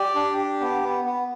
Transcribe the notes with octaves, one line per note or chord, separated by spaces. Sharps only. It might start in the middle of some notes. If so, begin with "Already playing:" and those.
Already playing: G4 D5
D4
G4
B3
B3
B3